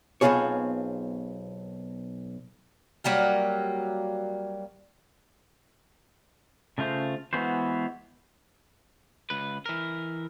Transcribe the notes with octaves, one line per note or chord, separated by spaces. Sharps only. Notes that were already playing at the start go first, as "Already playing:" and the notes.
B1 B3 C4 F4 G#4 C#5
F#3 G3 A#3 A#4
C#3 A3 F4 C5
E3 G#3 B3 F#4 C5
C#2 B4
E3 A#4